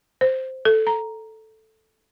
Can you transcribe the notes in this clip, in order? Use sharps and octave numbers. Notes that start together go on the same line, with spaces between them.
C5
A4
A#5